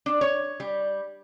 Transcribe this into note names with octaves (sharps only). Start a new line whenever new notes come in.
D4
C#5
G3